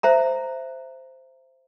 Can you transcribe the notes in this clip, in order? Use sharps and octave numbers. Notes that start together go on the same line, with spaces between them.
C5 E5 A#5